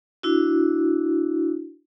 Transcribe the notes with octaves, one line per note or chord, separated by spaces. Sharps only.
D4 E4 F#4